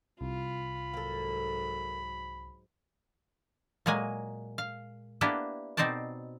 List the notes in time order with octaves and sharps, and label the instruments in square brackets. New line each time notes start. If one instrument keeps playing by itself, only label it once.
[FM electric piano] C2 [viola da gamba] F4 [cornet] B5
[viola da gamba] G#2 F#3 [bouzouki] A#3 A4
[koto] A#2 F#3 G#3 A#3 G#5
F5
A#3 B3 D4 E4 G4 B4
B2 C4 D#4 C5 D5 A5